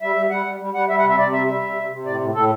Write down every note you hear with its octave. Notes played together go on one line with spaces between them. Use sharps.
G3 E5
G3
G3 F#5
G3
G3
G3 F#5
G3 E5
F#5
C3
E5
C3 D5
G3 E5
G3 E5
C3
C3
C3
A2 D5
A2
A2 A4